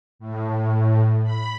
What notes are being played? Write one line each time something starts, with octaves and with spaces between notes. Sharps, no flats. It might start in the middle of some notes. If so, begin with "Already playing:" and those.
A2
B5